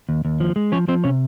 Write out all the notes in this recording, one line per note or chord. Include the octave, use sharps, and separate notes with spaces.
D#2
D#2
F3
G#3
F3 C#4 C#5
F3 C4 C5
C3 C#4 C#5